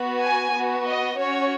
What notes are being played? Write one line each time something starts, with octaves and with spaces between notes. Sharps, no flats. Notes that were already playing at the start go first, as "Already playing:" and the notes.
Already playing: B3 F#4
G#5
B3 F#4
D#5
C#4 F#4 C#5